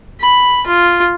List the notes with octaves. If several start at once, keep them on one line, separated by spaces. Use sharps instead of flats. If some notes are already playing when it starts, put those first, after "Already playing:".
B5
F4